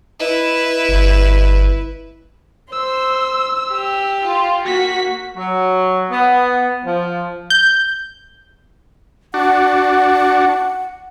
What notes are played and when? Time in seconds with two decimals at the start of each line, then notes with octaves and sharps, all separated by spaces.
0.20 E4 B4 D#5
0.89 G1
2.72 C5 E6
3.73 G4
4.22 F4
4.65 A#3 F#4 B6
5.36 F#3
6.10 B3
6.85 F3
7.50 G6
9.34 D4 F#4 F#5